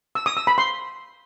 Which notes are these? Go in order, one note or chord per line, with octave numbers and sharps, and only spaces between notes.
E6
D#6
E6
B5
C6